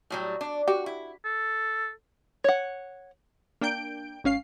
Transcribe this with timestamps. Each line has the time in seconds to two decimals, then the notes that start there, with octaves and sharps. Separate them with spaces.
0.10 A2 F#3 G3
0.41 D4
0.68 F#4 G4
0.86 E4
1.25 A4
2.44 C#5 F#5
3.61 A#3 D4 G5 G6 D7
4.24 G#1 C#4 F5 C7